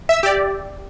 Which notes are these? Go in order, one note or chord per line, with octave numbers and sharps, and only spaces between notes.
E5 E6
G4 D5